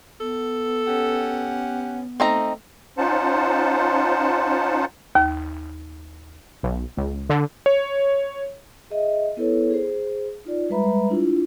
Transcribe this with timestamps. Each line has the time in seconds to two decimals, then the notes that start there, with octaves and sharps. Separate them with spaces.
0.20 B3 A4
0.87 C#4 G4 F#5
2.20 A3 C4 D#4 A#5
2.98 C#4 D#4 F4 C5 F#5 A5
5.15 D#2
6.63 B1
6.97 C#2
7.30 D3
7.66 C#5
8.90 G#4 D#5 E5
9.37 B3 E4 A4 B4 C#5
9.71 G#4 C5
10.45 D#4 F4 D5
10.70 G3 G#3 B4 E5 A#5 B5
11.10 D4 E4 F4